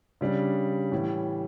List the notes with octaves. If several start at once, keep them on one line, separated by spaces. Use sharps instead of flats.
C#3 G3 D4
A2 E3 G3